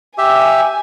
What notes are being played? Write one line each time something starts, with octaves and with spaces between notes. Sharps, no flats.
G4 E5 G#5